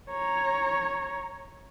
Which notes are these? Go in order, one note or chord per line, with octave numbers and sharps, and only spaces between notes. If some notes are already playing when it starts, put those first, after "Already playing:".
C#5 A#5